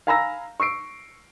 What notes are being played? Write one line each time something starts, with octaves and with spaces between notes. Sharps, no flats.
F5 G#5 A#5 B5 E6 A#6
C#6 E6 C7 D7